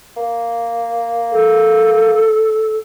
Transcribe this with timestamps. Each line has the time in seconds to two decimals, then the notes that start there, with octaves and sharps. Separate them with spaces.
0.17 A#3
1.32 A4